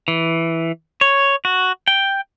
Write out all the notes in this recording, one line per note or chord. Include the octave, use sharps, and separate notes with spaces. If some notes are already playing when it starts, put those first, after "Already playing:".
E3
C#5
F#4
G5